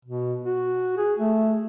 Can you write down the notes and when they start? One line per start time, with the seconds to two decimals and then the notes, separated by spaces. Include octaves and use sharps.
0.05 B2
0.45 F#4
0.98 G#4
1.19 A3